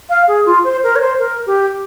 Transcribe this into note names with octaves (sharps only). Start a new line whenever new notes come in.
F5
G#4
F4
C5
A#4
C#5
C5
A#4
G4